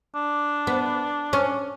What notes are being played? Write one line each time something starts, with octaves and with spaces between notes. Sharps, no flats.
D4
B3
C#4